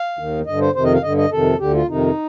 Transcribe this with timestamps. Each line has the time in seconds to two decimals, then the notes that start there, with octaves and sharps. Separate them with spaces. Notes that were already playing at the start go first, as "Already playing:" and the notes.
Already playing: F5
0.19 D#2 D#3
0.46 G2 D3 D#5
0.61 C5
0.75 F2 C3 D#3 C5
0.84 D#5
0.94 F5
1.03 G2 D3 D#5
1.17 D#5
1.31 F2 C3 D#3 A4
1.59 D2 D3 G4
1.74 F4
1.88 F2 C3 D#3 D#4